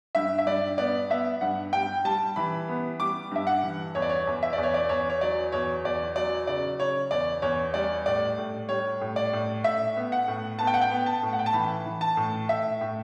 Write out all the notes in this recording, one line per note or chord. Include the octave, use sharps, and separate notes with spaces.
G2 E5
E5
G2 D5
B3 D5
B3 E5
G2 F#5
G3 G5
G3 A5
E3 B5
B3
G3 D6
G2 E5
F#5
E3
E2 C#5
D5
C#5
E2
E5
E2 D5
C#5
D5
E2 C#5
C#5
F#3 D5
E2 C#5
E2 D5
F#3 D5
C#3 D5
C#3 C#5
E2 D5
E2 C#5
G3 D5
A2 D5
A2
G3 C#5
A2
D5
A2
A2 E5
B3
F#5
A2
B3 A5
G5
F#5
G5
B3
A5
A2
F#5
G5
A5
E3 B5
E3
A5
A2
A2 E5
A2